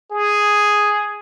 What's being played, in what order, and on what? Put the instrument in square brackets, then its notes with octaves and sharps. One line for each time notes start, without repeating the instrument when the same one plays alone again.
[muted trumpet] G#4